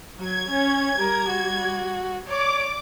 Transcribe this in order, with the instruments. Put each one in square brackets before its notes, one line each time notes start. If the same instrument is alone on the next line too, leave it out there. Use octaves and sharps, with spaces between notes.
[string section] F#3 [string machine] G#6
[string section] C#4
[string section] G3 [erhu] A#4
[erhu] F#4
[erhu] C#5 [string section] D5 [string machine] D6